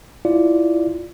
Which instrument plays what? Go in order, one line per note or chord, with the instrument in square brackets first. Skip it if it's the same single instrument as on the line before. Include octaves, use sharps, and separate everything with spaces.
[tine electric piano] E4 F4 D5